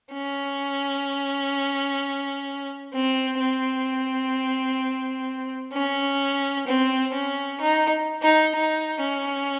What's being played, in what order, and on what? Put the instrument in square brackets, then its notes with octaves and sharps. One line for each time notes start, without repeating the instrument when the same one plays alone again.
[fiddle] C#4
C4
C4
C#4
C4
C#4
D#4
D#4
D#4
C#4